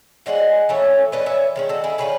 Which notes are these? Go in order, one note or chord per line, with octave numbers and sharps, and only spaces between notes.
E3 G#3 C#4 D#5 F#5
E3 A3 C#4 C#5 E5
E3 A3 C#4 B4 D#5
C#5 E5
D#3 G#3 C#4
F#4 A4
E4 G#4
D#3 G#3 C#4 G#4 B4